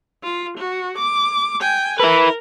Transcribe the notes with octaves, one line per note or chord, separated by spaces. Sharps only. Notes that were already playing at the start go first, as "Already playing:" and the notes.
F4
F#4
D6
G5 G#5
E4 A#4 B4